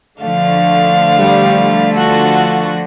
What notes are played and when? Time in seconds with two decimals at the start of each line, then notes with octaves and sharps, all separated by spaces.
0.23 D3 F3 A3 F5
1.19 G3
1.96 F4 F#4 A4